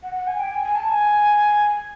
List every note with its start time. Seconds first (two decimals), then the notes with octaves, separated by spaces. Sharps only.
0.03 F#5
0.16 F#5
0.27 G#5
0.39 G5
0.51 G#5
0.63 G#5
0.75 A5
0.88 G#5